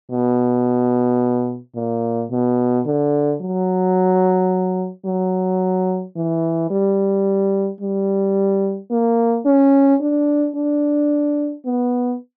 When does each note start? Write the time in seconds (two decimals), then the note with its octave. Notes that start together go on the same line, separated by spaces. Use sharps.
0.11 B2
1.76 A#2
2.31 B2
2.86 D3
3.42 F#3
5.06 F#3
6.17 E3
6.71 G3
7.81 G3
8.91 A#3
9.46 C#4
10.01 D4
10.56 D4
11.65 B3